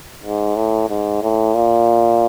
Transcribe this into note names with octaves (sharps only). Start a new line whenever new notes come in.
G#2
A2
G#2
A2
A#2